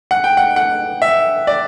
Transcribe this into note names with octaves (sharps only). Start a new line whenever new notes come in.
F#5
G5
F#5
F#5
E5
D5